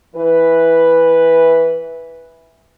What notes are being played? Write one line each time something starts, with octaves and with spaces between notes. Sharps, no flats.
E3 B4